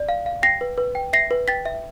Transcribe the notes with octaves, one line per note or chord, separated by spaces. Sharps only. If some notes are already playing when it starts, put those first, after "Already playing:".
Already playing: D5
F5
F5
G5 A#6 C7
B4
B4
G5
E5 A#6 C7
B4
G5 A6 B6
E5